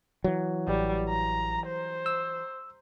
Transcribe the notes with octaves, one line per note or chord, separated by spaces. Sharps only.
E3 F#3
A1 G3
A#5
C5
E6